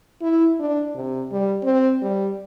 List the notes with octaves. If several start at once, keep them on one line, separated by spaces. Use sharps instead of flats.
E4
D4
C3
G3
C4
G3